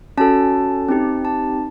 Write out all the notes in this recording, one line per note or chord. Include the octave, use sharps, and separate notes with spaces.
C#4 F#4 A4 A5
C4 D#4 G4
A5